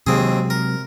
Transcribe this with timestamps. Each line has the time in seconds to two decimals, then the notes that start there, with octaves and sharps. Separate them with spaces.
0.07 D#2 C3 F#3 G#3 C4 G#4
0.50 A#4